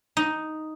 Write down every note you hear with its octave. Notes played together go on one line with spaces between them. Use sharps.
D#4